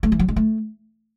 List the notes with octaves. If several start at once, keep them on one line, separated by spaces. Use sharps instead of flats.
A3
E3
F#3
G#3
A3